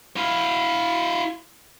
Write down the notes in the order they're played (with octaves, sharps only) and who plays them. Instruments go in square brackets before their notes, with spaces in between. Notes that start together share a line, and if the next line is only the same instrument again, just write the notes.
[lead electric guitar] E4 F5